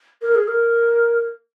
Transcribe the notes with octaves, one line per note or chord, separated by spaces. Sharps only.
A#4
G#4
A#4